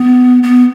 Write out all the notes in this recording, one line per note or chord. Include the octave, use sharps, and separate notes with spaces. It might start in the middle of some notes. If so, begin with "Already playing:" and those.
Already playing: B3
B3